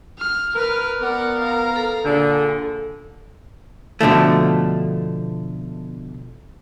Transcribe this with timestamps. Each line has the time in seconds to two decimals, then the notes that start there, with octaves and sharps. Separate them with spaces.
0.19 F6
0.55 A#4 B4 F6
1.01 B3 A#4 D5 F#5
1.40 F5 A#5
1.76 A4
2.05 A#2 D3 G#4
4.01 B2 D3 F3 A3